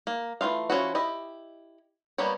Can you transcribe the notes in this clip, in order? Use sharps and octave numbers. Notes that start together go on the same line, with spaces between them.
A#3
E3 A3 F4 F5
F3 C#4 E4 F#4
E4 G4 D#5
G3 A#3 B3 G4 C#5